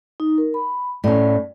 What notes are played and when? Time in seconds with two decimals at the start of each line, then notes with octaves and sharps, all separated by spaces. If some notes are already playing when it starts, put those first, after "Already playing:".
0.20 D#4
0.38 A#4
0.54 B5
1.04 A2 C#4 D5